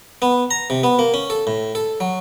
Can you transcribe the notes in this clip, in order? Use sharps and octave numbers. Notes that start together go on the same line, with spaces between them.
B3
A#5
C3
B3
A#3
C#4
A4
A2
A4
F#3